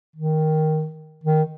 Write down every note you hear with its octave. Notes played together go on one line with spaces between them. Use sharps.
D#3
D#3